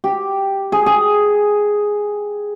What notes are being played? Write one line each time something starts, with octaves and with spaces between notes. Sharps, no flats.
G4
G#4
G#4